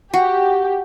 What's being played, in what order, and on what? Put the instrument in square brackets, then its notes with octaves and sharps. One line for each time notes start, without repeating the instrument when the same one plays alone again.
[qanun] F#4 [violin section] G4